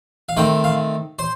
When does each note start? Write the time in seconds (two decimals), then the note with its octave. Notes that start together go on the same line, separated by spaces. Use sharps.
0.29 F5
0.37 D#3 A3 C4 G5
0.64 F5
1.19 C5